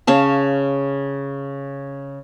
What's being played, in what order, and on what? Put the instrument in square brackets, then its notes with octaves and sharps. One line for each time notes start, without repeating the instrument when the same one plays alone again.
[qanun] C#3 C#4 F5 A5